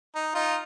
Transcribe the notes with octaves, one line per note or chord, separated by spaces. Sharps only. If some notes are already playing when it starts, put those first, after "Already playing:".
D#4
D#4 F4